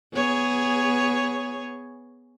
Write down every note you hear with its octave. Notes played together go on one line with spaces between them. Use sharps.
B3 G#4 C#5